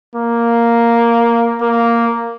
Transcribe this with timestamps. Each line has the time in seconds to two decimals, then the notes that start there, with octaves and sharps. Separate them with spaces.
0.15 A#3
1.61 A#3